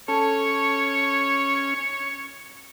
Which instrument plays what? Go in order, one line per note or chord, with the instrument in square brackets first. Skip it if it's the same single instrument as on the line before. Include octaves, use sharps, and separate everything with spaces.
[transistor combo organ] C#4 [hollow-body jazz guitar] A4 [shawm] C#5